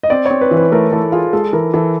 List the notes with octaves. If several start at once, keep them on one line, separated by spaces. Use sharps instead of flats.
D#5
C4 D5
C4 C#5
B4
E3
B4
A3 A#4
E3 A4
F4 G#4
G#3 A4
E3 A#4
E3 A4